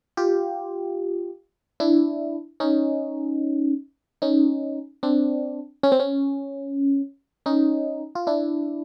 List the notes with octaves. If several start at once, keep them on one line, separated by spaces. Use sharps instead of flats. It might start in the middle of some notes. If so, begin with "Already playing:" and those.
F4 G4
D4 E4
C#4 D#4
C#4 D#4
C4 D4
C#4
C4
C#4
C#4 D#4
F4
D4 E4